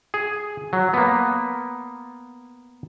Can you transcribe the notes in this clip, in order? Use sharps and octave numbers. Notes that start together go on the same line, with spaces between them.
G#4
F#3
A#3 B3